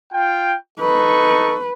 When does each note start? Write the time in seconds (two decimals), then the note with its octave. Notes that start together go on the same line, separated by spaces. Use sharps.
0.13 F4 G5
0.80 D#4 A4 B4 C#6